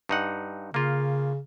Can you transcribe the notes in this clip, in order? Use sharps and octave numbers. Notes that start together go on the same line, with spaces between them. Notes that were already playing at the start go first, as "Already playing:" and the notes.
G2 D#4 F#5
C#3 A#3 F4